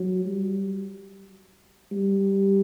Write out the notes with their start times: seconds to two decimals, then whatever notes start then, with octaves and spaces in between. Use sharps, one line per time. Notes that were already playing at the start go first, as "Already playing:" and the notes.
Already playing: F#3
0.25 G3
1.92 G3